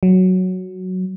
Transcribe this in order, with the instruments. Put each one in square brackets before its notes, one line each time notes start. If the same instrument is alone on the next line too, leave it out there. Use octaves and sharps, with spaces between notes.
[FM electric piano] F#3